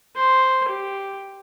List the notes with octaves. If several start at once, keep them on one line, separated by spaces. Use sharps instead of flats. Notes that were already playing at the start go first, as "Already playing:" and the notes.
C5
G4